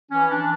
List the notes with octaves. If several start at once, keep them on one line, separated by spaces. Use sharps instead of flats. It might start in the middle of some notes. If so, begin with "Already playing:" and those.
E3 C#4
D4
E3